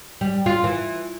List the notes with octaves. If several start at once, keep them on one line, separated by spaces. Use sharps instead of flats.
G3
F4
E3